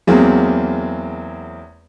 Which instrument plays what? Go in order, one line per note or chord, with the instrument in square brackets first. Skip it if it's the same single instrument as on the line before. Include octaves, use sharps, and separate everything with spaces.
[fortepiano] E2 F#3 G#3 A#3 C4